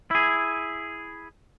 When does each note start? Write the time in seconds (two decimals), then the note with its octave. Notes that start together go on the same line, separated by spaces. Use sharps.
0.11 E4 G#4